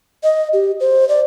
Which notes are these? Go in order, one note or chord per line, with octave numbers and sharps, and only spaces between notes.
D#5
G4
C5
D5